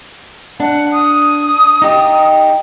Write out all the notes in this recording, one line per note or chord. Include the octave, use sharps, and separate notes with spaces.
D4 F#5
D#6
D#4 G4